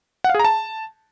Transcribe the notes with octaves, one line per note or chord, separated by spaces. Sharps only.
F#5
F5
G#4
A#5
A5